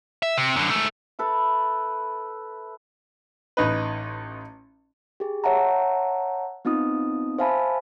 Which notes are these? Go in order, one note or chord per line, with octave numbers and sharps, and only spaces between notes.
E5
C3
F#2 D3
G#2 A3
E4 A4 B4
A1 D#4 B4
G4 G#4
C#5 E5 F#5 A5 A#5
B3 C4 D#4 F4 D#6
C5 E5 F5 G#5 A5 B5